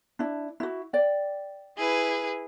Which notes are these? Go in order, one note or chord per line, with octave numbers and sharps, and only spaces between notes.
D4 E4
E4 F#4
D5 G5
E4 G#4 B4